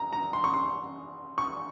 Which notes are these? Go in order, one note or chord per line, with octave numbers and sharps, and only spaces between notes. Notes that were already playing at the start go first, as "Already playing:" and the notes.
Already playing: A#5
A#5
C6
C#6
C6
C#6